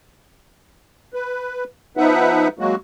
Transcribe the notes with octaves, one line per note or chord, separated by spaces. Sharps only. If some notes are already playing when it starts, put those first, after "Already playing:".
B4
F3 B3 D#4 B4 E5 F#5
F#3 G#3 A#3 F#4